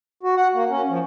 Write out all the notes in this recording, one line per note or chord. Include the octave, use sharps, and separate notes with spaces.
F#4
F#5
A#3
C#4
F3